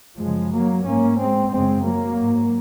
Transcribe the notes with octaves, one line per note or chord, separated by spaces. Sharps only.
F#2 C#3 F3 G#3
F#3 A#3
G#2 A#3 C#4
G#3 C4
F#2 C#3 G#3 C4
F#3 A#3
G#2